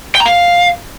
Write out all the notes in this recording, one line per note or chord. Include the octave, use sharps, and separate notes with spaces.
G5
A#5
F5